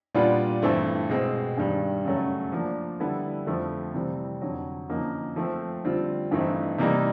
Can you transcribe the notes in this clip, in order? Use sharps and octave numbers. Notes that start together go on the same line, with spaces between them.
A#2 G3 B3 D4 F4
G2 E3 A3 C4
B2 G#3 C4
G2 D#3 G3
F#2 C#3 F#3 A3
F3 A#3 D4
D3 G3 B3 E4 A4
F2 D3 F3 A3 C4
C3 E3 G3 C4
F2 D3 F#3
F#2 D3 F3 A#3 D#4
F3 A3 C4
D3 G3 C4 F4
G2 E3 A3 C4 D#4
C3 E3 G3 A#3 D#4